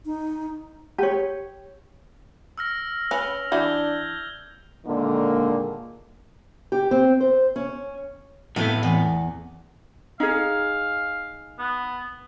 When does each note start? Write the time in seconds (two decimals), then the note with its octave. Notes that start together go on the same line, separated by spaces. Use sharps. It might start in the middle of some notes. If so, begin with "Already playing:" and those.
0.06 D#4
0.98 G4 C#5
2.58 E6 F6 A#6
3.11 C#4 B4 F6 F7
3.52 E3 D4 F#4 G6 G#6 G7
4.85 A#2 D3 D#3 G#3 A#3
6.72 G4
6.91 C4
7.21 C5
7.56 C#4
8.56 A2 A3 B3 E4 F5
8.83 E2
10.20 D#4 G#4 F5
11.59 B3